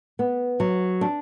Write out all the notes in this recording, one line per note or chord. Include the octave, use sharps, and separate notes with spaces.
B3
F#3
D4